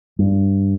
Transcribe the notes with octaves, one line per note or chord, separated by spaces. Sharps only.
G2